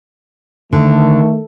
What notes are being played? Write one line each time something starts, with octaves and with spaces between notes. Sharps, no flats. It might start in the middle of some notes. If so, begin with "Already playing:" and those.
D3 D#3 A3